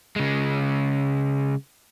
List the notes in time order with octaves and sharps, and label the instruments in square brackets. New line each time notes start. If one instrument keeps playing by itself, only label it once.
[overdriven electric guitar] C#3 G#3